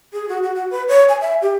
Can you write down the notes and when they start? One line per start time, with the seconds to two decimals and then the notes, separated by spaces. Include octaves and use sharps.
0.13 G#4
0.29 F#4
0.43 F#4
0.55 F#4
0.71 B4
0.88 C#5
1.09 G#5
1.21 E5
1.42 G4